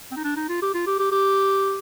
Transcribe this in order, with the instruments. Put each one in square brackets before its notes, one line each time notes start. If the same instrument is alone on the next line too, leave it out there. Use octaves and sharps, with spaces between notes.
[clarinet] C4
D#4
D4
D#4
F4
G4
F4
G4
G4
G4